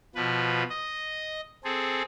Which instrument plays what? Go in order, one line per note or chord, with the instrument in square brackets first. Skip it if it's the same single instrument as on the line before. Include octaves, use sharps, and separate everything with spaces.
[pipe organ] B2 F3 B4
D#5
C4 G#4 A4